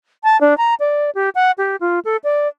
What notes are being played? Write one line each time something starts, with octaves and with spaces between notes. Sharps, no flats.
A5
D4
A#5
D5
G4
F#5
G4
F4
A4
D5